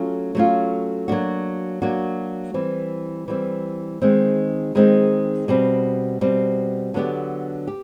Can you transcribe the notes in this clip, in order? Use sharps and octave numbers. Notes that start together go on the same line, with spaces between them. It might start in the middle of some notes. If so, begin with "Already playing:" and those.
Already playing: F#3 A3 C#4 F4
F#3 A3 C#4 F4
F#3 A#3 D4 F#4
F#3 A#3 D4 F#4
E3 G3 C4
E3 G3 C4
D#3 G#3 C4 D#4
D#3 G#3 C4 D#4
B2 G3 C4
B2 G3 C4
D3 F#3 B3 D4 G4
G4